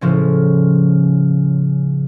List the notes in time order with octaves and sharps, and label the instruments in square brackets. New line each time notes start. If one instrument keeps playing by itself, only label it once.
[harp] A2 C#3 F3 C#4